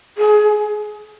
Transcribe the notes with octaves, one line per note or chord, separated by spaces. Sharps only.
G#4